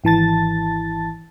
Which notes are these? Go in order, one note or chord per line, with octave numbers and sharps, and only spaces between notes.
G#1 E3 A5 A6